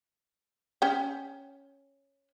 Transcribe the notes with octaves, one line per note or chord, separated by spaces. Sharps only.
C#4 G5